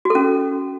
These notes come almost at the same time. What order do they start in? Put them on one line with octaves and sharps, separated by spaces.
F#4 A4 C#4